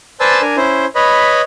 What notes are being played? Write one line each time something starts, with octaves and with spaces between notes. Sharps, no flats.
B4 C5 D5 G#5 A5 E6
D4 A#4 G#5
C#4 E4 C5
B4 C#5 D#5 B5